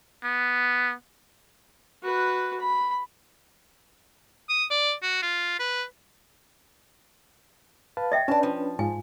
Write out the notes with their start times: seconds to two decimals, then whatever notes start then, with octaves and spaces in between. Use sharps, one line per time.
0.24 B3
2.03 F#4 B4
2.60 B5
4.49 D#6
4.71 D5
5.03 F#4
5.23 F4
5.60 B4
7.97 B4 F5 A5
8.12 D#5 E5 G5
8.28 C#4 D4 B4 D5 A5
8.43 F3
8.79 G#2 F4 G#5